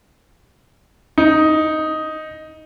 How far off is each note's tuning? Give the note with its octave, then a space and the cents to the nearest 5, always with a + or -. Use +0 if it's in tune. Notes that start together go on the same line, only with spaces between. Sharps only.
D#4 +5